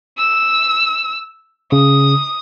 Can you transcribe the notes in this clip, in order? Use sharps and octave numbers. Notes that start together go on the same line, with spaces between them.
E6
C#3 D#6